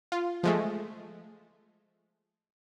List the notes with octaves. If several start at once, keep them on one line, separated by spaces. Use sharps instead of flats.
F4
F3 G#3 A3